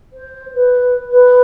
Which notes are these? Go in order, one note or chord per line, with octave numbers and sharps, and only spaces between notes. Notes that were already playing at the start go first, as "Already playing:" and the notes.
C5
B4
B4